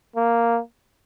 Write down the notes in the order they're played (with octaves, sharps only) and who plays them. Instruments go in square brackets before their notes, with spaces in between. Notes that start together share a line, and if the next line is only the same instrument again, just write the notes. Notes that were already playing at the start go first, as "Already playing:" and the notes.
[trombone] A#3